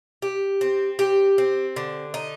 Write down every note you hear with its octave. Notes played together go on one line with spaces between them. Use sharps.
G4
C4
G4
C4
D3
D#4